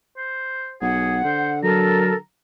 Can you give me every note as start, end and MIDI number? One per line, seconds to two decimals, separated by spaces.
0.17 0.74 72
0.82 1.24 35
0.82 1.16 68
0.82 1.61 78
1.25 2.18 50
1.25 1.52 72
1.64 2.12 54
1.64 2.15 69
1.64 2.15 70
1.64 2.15 82